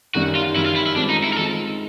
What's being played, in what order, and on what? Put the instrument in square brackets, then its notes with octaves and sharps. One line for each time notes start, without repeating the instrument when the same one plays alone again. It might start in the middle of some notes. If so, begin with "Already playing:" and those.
[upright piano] F#2 D#3 G3 [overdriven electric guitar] F#4
[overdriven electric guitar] F4
[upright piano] F#2 D#3 G3 [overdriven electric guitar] E4
[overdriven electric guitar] F4
E4
E4
[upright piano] D#3 G#3 C4 F4 [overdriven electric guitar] D4
[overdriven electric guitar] D#4
E4
A#4
[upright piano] D#3 G#3 C4 F4 [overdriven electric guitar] A4